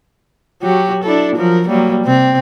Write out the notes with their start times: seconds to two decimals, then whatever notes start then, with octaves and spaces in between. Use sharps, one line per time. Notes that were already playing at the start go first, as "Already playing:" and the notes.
0.62 F#3 F#4 G4
1.04 D4 E4 A4
1.36 F3 F#3 A#4
1.68 F#3 G3 A#3
2.04 C3 C4